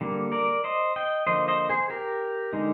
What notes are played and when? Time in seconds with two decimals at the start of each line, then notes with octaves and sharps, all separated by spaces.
0.01 D3 G3 A#3
0.32 A#4 D5
0.64 C5 D#5
0.96 D#5 G5
1.27 D3 F3 A#3 C5 D#5
1.48 C5 D#5
1.69 G#4 C5
1.90 G4 A#4
2.53 D3 G#3 D#4